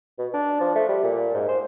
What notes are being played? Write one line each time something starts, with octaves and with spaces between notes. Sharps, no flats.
B2
D4
F3
A3
G3
A#2
G#2
C5